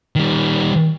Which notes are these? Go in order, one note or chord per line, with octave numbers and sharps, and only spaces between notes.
D#3 G3